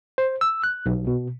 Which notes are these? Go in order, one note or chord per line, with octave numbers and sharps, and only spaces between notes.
C5
E6
F#6
B1
B2